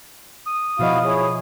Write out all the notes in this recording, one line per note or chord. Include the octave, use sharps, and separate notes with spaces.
D#6
B2 F3 E4 F#4 D#5 F5
E4 G#4 C#5